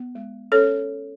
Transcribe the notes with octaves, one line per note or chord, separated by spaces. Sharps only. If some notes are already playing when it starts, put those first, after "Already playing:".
Already playing: B3
G#3
C#4 A4 C#5